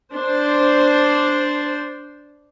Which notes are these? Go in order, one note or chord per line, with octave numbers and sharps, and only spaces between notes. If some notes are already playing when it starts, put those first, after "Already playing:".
D4 C5